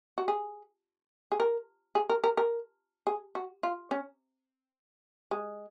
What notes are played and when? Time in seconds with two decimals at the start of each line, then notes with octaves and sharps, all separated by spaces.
0.18 F#4
0.28 G#4
1.32 G#4
1.40 A#4
1.95 G#4
2.09 A#4
2.24 A#4
2.37 A#4
3.07 G#4
3.35 F#4
3.63 F4
3.91 C#4
5.31 G#3